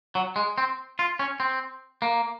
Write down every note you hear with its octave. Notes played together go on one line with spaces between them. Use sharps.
F#3
G#3
C4
F4
C#4
C4
A#3